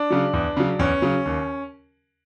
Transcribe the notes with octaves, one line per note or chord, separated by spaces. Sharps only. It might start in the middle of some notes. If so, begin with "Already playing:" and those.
Already playing: D4
C#3 F#3
E2
C#3 F#3
E2 C#4
C#3 F#3
D#2